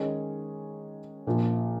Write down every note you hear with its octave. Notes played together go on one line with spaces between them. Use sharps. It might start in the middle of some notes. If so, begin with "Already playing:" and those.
Already playing: D#3 G#3 C#4 G#4 C#5
A#1 A#2 F3